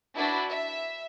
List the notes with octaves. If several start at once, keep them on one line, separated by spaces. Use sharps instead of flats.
D4 E4 F#4 B4
E5